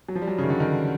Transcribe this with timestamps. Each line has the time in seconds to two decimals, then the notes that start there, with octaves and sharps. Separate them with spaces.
0.09 F#3
0.15 F3
0.22 G3
0.28 F#3
0.38 C#3
0.43 D#3
0.50 D3
0.60 D#3